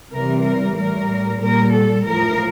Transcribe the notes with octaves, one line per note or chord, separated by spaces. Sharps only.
C3 E3 G3 A#4
A#4
A2 G3 A#4
A#2 G3 A#4
A4
A2 F3 A#4